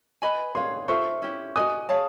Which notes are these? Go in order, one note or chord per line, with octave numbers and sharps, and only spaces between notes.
B4 D#5 G#5 B5
G#4 C#5 F5 C6
F4 A4 C5 E5 C#6
C#4 E4 G4
F#4 B4 D#5 G#5 D#6
G#4 C#5 F5 A5